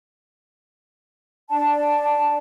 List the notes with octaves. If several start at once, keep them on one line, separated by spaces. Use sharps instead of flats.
D4 D5 A5